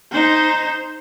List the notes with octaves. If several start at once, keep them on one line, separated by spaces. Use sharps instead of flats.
D#4 C5